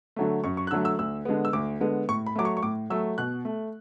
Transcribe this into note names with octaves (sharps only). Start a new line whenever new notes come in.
D3 F#3 A3
F#2 C#6
C#6
F#6
D3 F#3 A3 E6
E6
D2 E6
D3 G#3 B3
E6
D2 D6
D3 G#3 B3
A2 C#6
B5
F#3 A3 D6
C#6
C#6
A2 D6
F#3 A3 E6
B2 F#6
A3